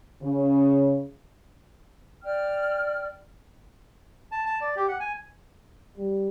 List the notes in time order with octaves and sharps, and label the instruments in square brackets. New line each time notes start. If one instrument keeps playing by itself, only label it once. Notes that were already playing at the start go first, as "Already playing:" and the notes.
[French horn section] C#3
[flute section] D5 G5 F6
[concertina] A5
A5
D5
G4
F#5
G#5
[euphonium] G3